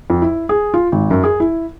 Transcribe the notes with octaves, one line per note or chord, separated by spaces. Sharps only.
F2
E4
G#4
F4
G#1
F#2
G#4
E4